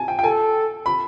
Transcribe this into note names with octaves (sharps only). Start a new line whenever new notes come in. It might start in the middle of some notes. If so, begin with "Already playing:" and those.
Already playing: G#5 A5
G5
G5
A4 G#5
B5